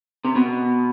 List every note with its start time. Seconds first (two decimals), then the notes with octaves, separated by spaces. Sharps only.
0.25 C3
0.36 B2